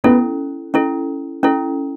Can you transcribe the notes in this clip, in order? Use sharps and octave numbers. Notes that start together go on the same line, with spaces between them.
B3 C#4 E4 A4
C#4 E4 A4
C#4 E4 A4